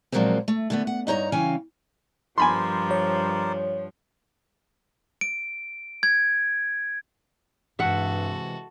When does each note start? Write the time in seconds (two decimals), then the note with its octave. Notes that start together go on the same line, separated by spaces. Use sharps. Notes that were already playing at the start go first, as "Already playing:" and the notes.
0.12 A#2 F3 F#3 G#3 A#3 C4
0.48 A3
0.70 D3 A3 B3
0.87 F#5
1.07 G2 D#4 C#5 A#5
1.32 C#3 E3 C#4 F5 G5 G#5
2.38 G2 F3 A#4 C5 D5 G#5 B5 C6
2.91 C#5
5.21 D7
6.03 G#6
7.79 G2 C3 E3 G#3 F#4 A4 E5 F#5